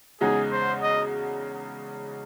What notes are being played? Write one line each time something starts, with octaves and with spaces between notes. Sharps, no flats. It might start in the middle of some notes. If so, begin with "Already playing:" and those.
E2 C#3 G#3 D#4 F#4 G#4
C5
D#5